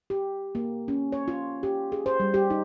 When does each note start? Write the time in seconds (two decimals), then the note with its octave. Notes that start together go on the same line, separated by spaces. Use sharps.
0.10 G4
0.55 A#3
0.88 C#4
1.12 C#5
1.28 F4
1.63 G4
1.92 G#4
2.06 C5
2.20 G3
2.34 G4
2.50 D#4